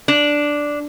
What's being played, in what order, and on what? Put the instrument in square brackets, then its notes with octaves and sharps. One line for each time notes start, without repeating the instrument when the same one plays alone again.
[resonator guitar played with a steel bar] D4